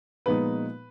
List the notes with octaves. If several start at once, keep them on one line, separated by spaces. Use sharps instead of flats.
A#2 F3 G#3 B3 D#4 B4